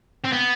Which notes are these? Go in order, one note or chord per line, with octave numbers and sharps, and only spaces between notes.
C4
B3